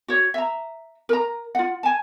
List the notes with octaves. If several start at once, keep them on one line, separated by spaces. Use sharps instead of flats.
F#4 C#5
E5 A#5
A#4 A#5
F4 F#5
G#5 A5